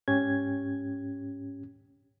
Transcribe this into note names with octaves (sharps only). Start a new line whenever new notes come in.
G#2 C#4 G4 G#6